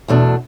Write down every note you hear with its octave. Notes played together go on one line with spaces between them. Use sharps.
E2 B2 A3 D4